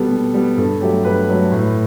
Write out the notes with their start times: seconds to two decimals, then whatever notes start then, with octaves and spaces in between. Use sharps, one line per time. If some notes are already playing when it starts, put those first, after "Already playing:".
Already playing: B2 G3 B3 A4
0.10 B2
0.34 G3 B3
0.57 G2 A4
0.81 F#3 A3 G4
1.05 G2 B4
1.29 F#3 A3
1.52 A2